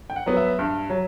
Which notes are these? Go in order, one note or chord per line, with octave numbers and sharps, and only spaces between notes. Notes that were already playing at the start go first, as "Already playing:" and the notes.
G5
F#5
F#3 B3
E5
G2
F#3